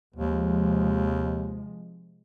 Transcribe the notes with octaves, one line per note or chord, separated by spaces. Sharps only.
D#2 C3 F3 G#3